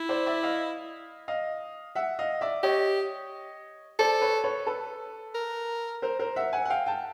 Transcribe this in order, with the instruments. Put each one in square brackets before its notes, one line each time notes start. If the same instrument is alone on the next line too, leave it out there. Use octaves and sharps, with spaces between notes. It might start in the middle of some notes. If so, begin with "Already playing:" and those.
Already playing: [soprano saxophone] E4
[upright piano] C5 D5
D5 E5
D#5 F5
D#5 F5
E5 F#5
D#5 F5
D5 E5
[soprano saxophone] G4 [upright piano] C#5 D#5
[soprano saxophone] A4 [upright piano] C5 D5
[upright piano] B4 C#5
B4 C#5
A4 B4
[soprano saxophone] A#4
[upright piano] A#4 C5
A#4 C5
E5 F#5
F#5 G#5
F#5
F5 G5
G5 A5